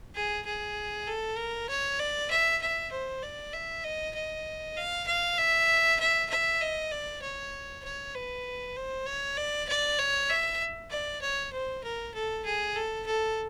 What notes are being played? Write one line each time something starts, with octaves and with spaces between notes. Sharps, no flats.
G#4
G#4
A4
A#4
C#5
D5
E5
E5
C5
D5
E5
D#5
D#5
F5
F5
E5
E5
E5
D#5
D5
C#5
C#5
B4
C5
C#5
D5
D5
C#5
E5
D5
C#5
C5
A#4
A4
G#4
A4
A4